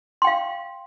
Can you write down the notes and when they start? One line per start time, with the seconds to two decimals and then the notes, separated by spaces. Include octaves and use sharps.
0.22 C6
0.24 G5
0.27 F5